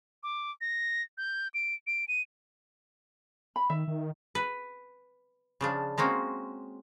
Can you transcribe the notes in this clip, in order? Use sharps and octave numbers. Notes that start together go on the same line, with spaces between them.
D6
A#6
G6
D7
D7
D#7
B5
D#3 E5
D#3
B4
C#3 F3 D4
G#3 A#3 C4 C#4 F#4